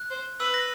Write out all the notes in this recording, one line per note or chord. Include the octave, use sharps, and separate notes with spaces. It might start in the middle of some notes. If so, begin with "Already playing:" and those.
Already playing: F#6
C5
B4 E6
A#6